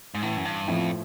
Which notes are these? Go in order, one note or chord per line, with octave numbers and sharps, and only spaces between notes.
G#2
A1 A2
F#2
G2
F2 A2 F3